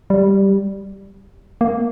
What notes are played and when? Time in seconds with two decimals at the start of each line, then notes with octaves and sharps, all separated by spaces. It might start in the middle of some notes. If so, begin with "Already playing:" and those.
0.10 G3
1.61 A#3